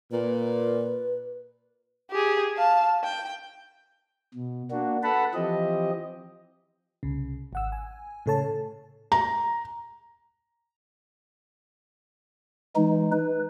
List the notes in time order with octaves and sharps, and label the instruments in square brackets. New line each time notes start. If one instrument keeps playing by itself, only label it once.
[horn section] A#2 [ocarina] B4
[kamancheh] G4 G#4
F5 A5
G5
[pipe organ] B2
A#3 D4 F#4
A4 B4 F#5 A5 B5
E3 F3 C4 G4 D#5
[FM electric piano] C2 C#3
G#1 F#5 E6
G#5
A2 C#3 A4 C#5 A5
[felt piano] A#5
[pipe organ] E3 G#3 D#4
B4